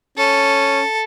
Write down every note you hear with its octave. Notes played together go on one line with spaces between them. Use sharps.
C#4 A4